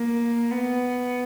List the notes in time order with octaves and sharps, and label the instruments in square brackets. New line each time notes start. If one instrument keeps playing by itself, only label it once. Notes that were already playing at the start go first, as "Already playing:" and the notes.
Already playing: [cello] A#3
B3